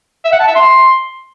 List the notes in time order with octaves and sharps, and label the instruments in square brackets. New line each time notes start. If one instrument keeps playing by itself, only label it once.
[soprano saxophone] E5
F#5
A5
E5
C6